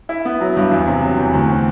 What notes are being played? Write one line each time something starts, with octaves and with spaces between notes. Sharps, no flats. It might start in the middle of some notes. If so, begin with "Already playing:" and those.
E4
B3
F#3
G2
E2
C3
F#3
E2
D2
C4